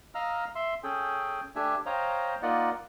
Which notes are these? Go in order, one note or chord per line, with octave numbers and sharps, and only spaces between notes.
D#5 F5 A#5 E6 F6
E5 C6
C#4 G#4 A4 G5
A3 D4 G4 E5 G#5
C5 C#5 D#5 F5 G5 A#5
A#3 D#4 F4 D5 D#5 F#5